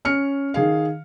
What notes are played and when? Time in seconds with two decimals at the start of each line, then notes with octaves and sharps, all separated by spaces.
0.05 C#4 F6 C#7
0.54 D#3 G#4 F5